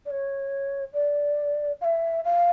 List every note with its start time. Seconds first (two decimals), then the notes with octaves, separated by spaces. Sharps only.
0.06 D5
0.11 C#5
0.93 D5
1.81 F5
1.84 E5
2.25 F5